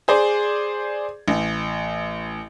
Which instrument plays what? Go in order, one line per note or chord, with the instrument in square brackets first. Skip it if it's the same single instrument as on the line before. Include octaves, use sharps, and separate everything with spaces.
[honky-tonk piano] G#4 C5 D5
A1